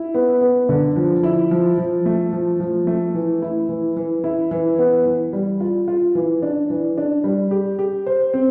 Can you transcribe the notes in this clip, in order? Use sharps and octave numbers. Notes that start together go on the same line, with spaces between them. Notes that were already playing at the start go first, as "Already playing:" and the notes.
Already playing: E4
B3
B3
D3
F3
E4
F3
F3
A3
F3
F3
A3
E3
E4
E3
E3
E4
E3
B3
E3
G3
F4
F4
E3
D4
E3
D4
G3
G4
G4
C5
C4